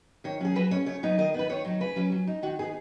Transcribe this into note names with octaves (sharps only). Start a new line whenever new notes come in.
D#3 C#5
F#3 C#4 G#4
F#3 B4
C#4 C#5
C#3 C#5
F#3 B3 D#4
D#3 D#5
B3 D#4 B4
D#3 C#5
F#3 D#4
C#3 B4
F#3 C#4
F#3
D#4
D#3 F#4
B3 D#4 G#4